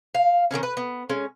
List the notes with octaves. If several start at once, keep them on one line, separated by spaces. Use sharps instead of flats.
F5
D#3 F#3 C4 C#4
B4
B3
G#3 C#4